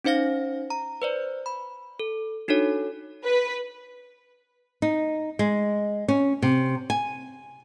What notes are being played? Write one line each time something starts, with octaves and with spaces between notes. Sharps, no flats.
C#4 D#4 C5 F5 A#6
A#5
B4 C5 D5
B5
A4
D4 D#4 F#4 A4 C#5
B4
D#4
G#3
C#4
C3
G#5